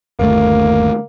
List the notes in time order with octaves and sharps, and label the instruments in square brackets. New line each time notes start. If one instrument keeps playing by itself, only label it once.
[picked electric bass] G1 D#2 A3 [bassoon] A#3